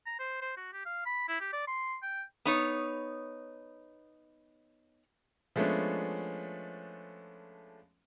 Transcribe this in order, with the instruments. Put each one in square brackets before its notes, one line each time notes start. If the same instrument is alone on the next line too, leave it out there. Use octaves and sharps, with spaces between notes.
[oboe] A#5
C5
C5
F#4
G4
F5
B5
E4
G4
D5
C6
G5
[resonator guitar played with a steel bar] B3 D#4 C#5
[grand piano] F3 G#3 A3 B3 C#4 D4